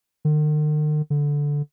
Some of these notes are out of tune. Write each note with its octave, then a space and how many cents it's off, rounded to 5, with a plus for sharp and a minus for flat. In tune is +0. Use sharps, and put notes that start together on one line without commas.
D#3 -45
D3 -10